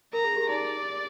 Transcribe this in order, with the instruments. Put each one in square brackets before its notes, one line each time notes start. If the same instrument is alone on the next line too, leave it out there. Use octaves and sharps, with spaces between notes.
[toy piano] A#4 [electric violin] A#5
[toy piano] G#4
G4
[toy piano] D#4 [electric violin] D5